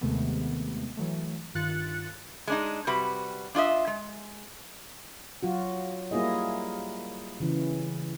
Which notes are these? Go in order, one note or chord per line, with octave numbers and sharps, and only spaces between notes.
D#2 C3 D#3 G#3 A3 B3
E3 F#3 A3
G2 D#3 F4 F#6 A6 C#7
G#3 D4 D#4
C3 G3 F#4 B4
D4 F4 D#5 E5
G#3
F#3 F4 F#4
G3 A#3 E4 F4 G#4 D#5
C#3 E3